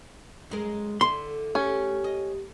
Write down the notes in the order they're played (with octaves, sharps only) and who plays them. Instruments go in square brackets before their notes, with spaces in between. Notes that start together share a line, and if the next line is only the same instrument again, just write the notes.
[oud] F#2 G#3 A#4
[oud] D3 E4 [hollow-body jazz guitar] C6
[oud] A3 [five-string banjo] C#4 [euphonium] G4
[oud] D#5